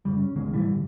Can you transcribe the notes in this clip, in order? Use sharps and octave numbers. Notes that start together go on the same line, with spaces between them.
F#2 C#3 G3
C#4
C#2 B2 D#3 G#3
B1 A2 E3 G3
G1